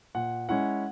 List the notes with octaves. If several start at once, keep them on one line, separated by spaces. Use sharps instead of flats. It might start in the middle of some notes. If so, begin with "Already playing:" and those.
A#2 F#5
G#3 C#4 E4 F#5